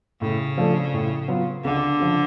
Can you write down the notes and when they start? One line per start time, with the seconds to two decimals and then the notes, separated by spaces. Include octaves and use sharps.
0.21 A2 C#3
0.58 F3 A3 D4
0.94 A2
1.28 F#3 B3 F4
1.64 C#2 D3
1.99 C#3 F3